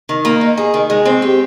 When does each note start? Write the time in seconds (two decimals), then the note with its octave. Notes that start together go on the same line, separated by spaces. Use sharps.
0.09 D#3
0.25 A#3
0.41 D#4
0.57 G#4
0.74 D#3
0.90 G#3
1.05 C4
1.22 G4